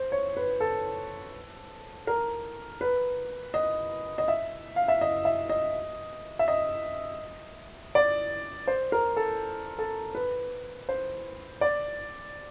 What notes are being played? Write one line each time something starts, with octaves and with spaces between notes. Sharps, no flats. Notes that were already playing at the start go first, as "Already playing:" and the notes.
Already playing: C5
C#5
B4
A4
A#4
B4
D#5
D#5
E5
F5
E5
D#5
E5
D#5
E5
D#5
D5
C5
A#4
A4
A4
B4
C5
D5